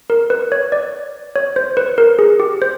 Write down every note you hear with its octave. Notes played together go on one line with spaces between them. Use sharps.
A#4
B4
C#5
D5
C#5
C5
B4
A#4
G#4
G4
C5